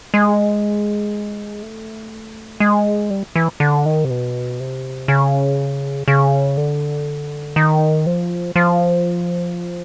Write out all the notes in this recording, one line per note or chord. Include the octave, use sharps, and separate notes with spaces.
G#3
A3
G#3
G3
E3
D3
D#3
C3
B2
C3
C#3
C#3
D3
D#3
F3
F3